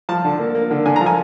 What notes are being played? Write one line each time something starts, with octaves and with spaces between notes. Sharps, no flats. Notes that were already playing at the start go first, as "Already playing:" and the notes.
F3 A5
D3
A#3
A#3
D3
D3 G#5
F3 A#5
G#5